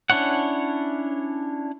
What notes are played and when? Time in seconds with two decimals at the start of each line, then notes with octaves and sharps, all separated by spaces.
0.10 C#4 D4 E4 C#5 F#5